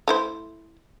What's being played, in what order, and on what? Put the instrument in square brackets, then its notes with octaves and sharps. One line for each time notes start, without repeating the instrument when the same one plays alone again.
[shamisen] A3 E4 C5